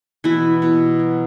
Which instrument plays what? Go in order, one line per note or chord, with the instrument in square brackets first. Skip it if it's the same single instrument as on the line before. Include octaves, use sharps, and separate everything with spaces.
[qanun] B2 E3 E4
B2
F#3